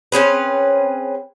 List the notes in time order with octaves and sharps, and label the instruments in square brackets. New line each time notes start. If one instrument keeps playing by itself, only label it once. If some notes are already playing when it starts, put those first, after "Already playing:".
[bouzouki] C4 C#4 G#4 B4